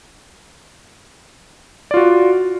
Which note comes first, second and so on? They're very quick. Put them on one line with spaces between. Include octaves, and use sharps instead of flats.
D5 F4 F#4